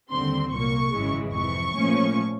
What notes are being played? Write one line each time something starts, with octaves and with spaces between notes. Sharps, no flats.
D#2 D3 G3 C4 C6
C2 A#2 F#3 A#3 C#6
G#1 F#2 C#3 E3 G#3
F2 C3 E3 C#6
A#2 F3 A3 C#4